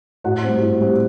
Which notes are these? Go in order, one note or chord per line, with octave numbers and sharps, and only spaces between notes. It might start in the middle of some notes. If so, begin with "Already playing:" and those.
A2 F#4 F#5
G3 C4
A2
G3 C4